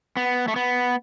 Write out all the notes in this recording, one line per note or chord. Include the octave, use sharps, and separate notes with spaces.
B3
A3
B3